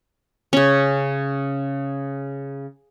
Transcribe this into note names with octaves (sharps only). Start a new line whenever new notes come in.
C#3 C#4